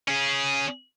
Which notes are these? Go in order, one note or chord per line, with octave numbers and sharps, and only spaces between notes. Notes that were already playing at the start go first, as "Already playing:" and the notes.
C#4 G#4